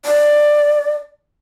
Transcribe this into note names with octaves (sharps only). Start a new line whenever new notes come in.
D5